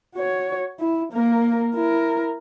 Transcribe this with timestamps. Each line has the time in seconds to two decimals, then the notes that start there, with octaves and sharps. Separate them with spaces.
0.15 F#4 C#5
0.80 E4
1.13 A#3 A#4
1.75 E4 A#4